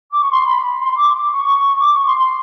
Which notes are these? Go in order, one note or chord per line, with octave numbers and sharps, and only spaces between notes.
D6
C#6
C6
B5
C6
D6
D6
C#6
D6
C#6
C6
C6